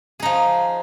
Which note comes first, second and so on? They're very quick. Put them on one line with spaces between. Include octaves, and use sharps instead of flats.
G#4 D#4 F3